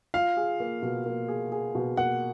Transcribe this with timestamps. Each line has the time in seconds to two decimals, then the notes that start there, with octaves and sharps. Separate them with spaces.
0.14 F4 F5
0.37 G#4
0.60 A#3
0.82 B2
1.06 A#3
1.28 G#4
1.52 G#4
1.75 B2
1.97 A#3 F#5